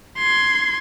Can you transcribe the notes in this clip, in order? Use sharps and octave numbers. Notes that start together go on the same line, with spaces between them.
C6 G#6